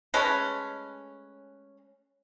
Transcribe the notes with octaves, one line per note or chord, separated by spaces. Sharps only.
G#3 A3 C#4 B4